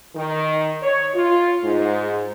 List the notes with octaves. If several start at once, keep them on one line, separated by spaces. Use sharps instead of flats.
D#3
C#5
F4
G#2